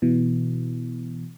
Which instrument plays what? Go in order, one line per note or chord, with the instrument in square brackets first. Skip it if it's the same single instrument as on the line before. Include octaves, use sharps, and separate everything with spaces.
[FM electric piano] B2 E3